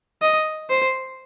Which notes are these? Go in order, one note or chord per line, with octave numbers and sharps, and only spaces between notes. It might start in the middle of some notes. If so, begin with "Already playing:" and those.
D#5
C5